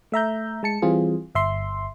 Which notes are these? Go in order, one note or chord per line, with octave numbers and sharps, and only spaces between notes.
A3 E5 A#5 G6
G#3 A5 C#7
E3 G3 C4 F4 G#4
G1 E5 C6